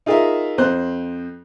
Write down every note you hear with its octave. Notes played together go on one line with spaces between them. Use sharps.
D#4 F4 G#4 A#4 E5
F2 C5 F#6